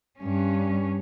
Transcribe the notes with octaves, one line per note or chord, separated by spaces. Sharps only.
G2 C#4